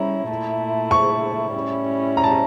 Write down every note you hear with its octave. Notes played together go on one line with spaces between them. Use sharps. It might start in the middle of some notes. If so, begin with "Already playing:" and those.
Already playing: G3 C#4 E4 A#5
A#2 A3 E4
C#6
A2 G3 C#4 E4
A#5
A5
A#5